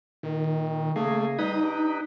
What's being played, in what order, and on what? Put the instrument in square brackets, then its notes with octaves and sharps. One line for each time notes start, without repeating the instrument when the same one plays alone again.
[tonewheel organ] A#2 [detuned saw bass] D#3
[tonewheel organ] C#3 A#3 G#4 [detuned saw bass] A3
[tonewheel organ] G3 B4 D#6 [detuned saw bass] D#4
[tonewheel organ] D4 G4 B4